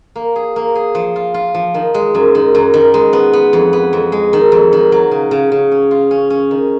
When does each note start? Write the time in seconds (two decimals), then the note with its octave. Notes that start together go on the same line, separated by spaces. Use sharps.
0.16 A#3
0.36 G#4
0.56 A#3
0.75 G#4
0.95 F3
1.16 F4
1.34 F4
1.54 F3
1.74 D#3
1.94 G#3
2.15 F#2
2.35 D#3
2.55 F#2
2.74 D#3
2.94 G#3
3.13 B3
3.33 B3
3.53 F2
3.73 B3
3.93 F2
4.12 G#3
4.33 D#3
4.52 F2
4.73 D#3
4.92 F#3
5.11 C#3
5.31 C#3
5.52 C#3
5.72 C#4
5.91 F4
6.11 C#4
6.30 C#4
6.51 D#3